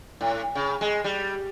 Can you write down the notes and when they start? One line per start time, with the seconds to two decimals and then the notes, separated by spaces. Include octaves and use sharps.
0.21 A2
0.55 C#3
0.81 G#3
1.04 G3